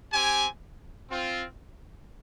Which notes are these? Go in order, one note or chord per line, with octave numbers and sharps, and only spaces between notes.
C4 G4 G#5
C4 F4